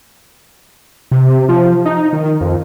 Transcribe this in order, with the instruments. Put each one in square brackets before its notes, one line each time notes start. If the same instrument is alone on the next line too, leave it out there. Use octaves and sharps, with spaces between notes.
[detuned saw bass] C3
F3
D#4
D#3
F2